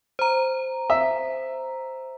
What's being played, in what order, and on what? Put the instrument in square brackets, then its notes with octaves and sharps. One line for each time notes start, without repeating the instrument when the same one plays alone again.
[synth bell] C5 A#5
[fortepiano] E5